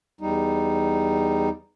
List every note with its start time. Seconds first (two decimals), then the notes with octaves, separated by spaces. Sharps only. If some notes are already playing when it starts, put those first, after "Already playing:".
0.21 E2 G3 D#4